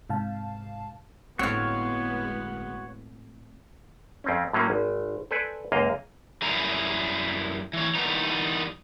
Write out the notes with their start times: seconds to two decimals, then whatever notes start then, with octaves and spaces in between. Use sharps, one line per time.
0.10 G#2 C3 F5 A5
1.39 G1 A2 G#3 B3 C4 F#4 C#5 F5
4.24 F2 C4 C#4
4.53 A2 F#3 A#3 C#4
4.70 G#1
5.31 A4 B4 C5 D5 G#5
5.72 C#2 F#2 A#3 D#5 F5
6.42 F#2 G3 E4 G#4 A#5
7.73 E3 C#5
7.95 D#3 E3 G3 B3 D#4